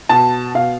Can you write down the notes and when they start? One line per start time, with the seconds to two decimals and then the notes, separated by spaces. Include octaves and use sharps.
0.09 B2 A5
0.55 B2 F5